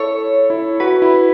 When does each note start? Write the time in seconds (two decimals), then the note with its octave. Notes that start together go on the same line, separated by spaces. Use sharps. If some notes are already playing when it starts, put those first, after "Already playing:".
Already playing: E4 A4 C#5
0.50 E4
0.80 F#4 B4
1.02 E4